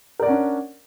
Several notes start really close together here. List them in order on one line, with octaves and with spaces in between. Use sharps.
A#4 D5 F#5 C#4 D4